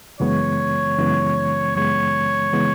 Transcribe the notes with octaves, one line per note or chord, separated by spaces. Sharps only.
F#2 C#3 E3 G#3 B3 C#5
F#2 C#3 E3 G#3 B3
F#2 C#3 E3 G#3 B3 C#5
C#3 E3 G#3 B3